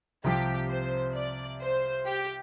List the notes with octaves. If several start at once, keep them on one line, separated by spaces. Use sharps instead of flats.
C2 C3 F3 G4
C5
D5
C5
G4